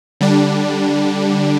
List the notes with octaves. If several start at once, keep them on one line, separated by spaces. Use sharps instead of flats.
D3 G3 D4